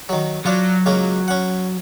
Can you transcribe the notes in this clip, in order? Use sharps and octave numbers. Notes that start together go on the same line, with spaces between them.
D#3 F#3
F#3 D4 F4
C#2 A#3 C#4
C#4 F#5